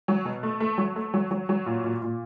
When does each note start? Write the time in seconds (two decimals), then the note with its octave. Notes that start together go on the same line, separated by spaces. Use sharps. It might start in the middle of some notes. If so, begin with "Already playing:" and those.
0.08 F#3
0.25 B2
0.43 A3
0.60 A3
0.78 F#3
0.96 A3
1.14 F#3
1.31 F#3
1.49 F#3
1.66 A#2
1.84 A#2
2.02 A#2